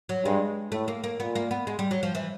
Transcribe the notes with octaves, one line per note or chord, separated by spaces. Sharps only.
F#3
G2 G#3
A2 A3
A#3
A#3
A#2 B3
A#3
B3
G#3
G3
F#3
F3
E3